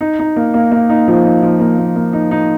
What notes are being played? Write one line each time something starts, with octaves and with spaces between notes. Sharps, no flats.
D#4
D#4
A#3
A#3
A#3
D#4
F3
D#4
F3
A#3
A#3
A#3
D#4
D#4